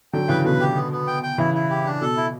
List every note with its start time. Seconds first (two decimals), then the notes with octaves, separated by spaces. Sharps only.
0.13 D3 F#3 G5
0.28 C#3 E3 B4
0.45 B2 D3 B4
0.60 G4
0.76 B3
0.92 B3
1.07 G5
1.23 G5
1.38 C#3 E3 E4
1.54 E4
1.70 G4
1.85 D4
2.01 B2 A4
2.17 E4